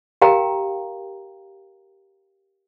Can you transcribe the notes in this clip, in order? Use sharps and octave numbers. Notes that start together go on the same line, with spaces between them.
G4 A#4 F5 G5 A#5